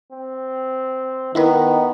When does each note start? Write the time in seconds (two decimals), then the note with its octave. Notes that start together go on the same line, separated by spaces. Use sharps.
0.12 C4
1.35 D#3 B3 E4 A#4 B4